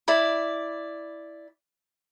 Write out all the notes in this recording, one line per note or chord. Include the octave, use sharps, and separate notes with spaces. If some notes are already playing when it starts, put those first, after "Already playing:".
E4 D5 B5